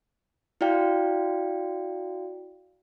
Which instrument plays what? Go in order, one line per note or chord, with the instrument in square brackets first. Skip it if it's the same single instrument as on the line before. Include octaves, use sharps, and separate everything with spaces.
[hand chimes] E4 F#4 D5 F5 G5